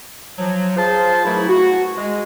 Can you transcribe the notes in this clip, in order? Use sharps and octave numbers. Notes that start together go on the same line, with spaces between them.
F3 F#3
F4 G#4 C5 A5
F#2 E3 F#3 A3 E4
F#4
G#3